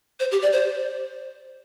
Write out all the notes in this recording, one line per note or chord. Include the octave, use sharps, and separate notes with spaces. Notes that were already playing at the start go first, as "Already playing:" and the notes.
C5
G4
D5
C5